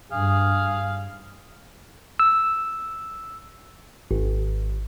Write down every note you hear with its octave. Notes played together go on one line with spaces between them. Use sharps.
G2 G#4 F5
E6
G#1